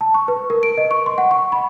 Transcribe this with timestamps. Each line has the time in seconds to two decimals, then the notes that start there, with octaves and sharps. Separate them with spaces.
0.01 A5
0.14 C#6
0.28 B4
0.50 A#4
0.63 D7
0.78 D#5
0.91 C#6
1.06 C6
1.18 F#5
1.31 C#6
1.52 B5